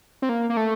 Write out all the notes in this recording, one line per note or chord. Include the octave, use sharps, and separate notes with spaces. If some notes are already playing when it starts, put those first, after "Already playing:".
C4
A#3
A#3
A3